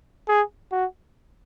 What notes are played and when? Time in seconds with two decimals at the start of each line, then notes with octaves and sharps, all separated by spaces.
0.28 G#4
0.72 F#4